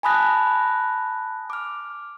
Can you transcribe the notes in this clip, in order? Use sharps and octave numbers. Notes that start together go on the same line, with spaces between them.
G#5 A5 B5 D#6 F#6 A#6
D6 F6